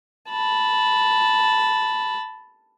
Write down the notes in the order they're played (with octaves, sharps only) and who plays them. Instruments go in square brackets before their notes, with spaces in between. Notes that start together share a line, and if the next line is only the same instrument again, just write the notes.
[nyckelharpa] A5 B5